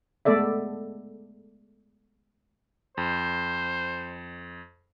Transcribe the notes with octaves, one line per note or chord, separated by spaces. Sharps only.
G#3 A3 B3 A4 D5 E5
F2 C5